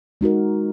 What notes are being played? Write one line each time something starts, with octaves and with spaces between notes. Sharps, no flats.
G#3 D#4 F#4 A#4